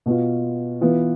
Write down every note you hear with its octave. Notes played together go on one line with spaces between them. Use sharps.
B2 B3 F4
E3 B3 F4